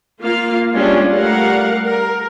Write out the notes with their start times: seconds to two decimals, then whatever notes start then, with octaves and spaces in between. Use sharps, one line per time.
0.21 A#3 F4 F5
0.74 G3 G#3 C#4 D4 F4
1.13 G3 A3 A#4 F5 F#5
1.84 A#4